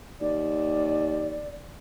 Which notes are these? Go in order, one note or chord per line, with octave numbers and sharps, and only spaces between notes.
D#2 D5